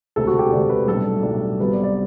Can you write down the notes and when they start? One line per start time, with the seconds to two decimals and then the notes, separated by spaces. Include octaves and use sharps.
0.16 E1 D2 C3 A4
0.27 F#4
0.39 G4
0.52 E1 D2 C3 D5
0.69 B4
0.87 B1 A2 G3 D4 A4
1.23 B1 A2 G3 D4
1.60 C2 C3 F#3 B3 B4
1.72 D5
1.83 D5